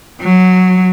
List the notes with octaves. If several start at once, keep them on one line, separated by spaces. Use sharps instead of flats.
F#3